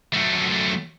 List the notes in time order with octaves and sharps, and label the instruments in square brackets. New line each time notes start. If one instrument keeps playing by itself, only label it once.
[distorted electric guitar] F#2 A3